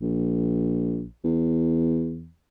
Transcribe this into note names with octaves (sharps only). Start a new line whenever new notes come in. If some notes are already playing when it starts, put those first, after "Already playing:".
A#1
E2